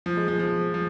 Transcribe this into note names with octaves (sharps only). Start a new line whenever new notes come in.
F3
G#3
F3
F3
F3